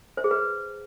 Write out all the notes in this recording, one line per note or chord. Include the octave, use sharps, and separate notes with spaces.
C5
G#4
B4